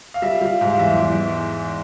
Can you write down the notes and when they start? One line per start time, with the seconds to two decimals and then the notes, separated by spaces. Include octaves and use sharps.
0.14 F5
0.22 G3 E5
0.41 G3 F5
0.61 G#2
0.70 F5
0.79 E2 E5
0.98 E2